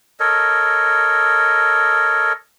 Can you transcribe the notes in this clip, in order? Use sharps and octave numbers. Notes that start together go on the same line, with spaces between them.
A4 A#4 C#5 D#5